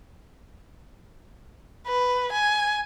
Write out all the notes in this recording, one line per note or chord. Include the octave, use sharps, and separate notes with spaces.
B4
G#5